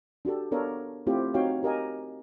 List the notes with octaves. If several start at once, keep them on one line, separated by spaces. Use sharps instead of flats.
D4 F#4 G4 A4
B3 D4 A4 A#4 C#5 F5
A3 C4 E4 F4 G4 C5
C4 D#4 F#4 C#5 F5 G5
G4 A#4 D#5 G#5